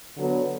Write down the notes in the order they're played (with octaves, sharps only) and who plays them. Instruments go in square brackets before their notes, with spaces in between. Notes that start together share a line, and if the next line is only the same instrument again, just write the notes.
[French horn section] D3 F#3 B3